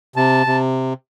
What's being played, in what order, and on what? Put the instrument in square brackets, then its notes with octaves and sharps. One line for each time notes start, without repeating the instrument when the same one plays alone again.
[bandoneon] C3 [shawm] A5
[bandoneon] C3